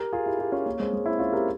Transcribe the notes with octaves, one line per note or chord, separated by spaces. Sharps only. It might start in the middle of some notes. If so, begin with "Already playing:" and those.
Already playing: G4 A#4
F4 G#4
E4 G4
E4 G4
C#4 F4
A#3 C#4
G#3 C4
G#3
C4 E4
C#4 F4
G4 A#4